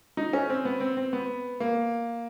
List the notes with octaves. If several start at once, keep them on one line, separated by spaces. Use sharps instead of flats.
D#4
C#4
C4
B3
C4
C4
B3
A#3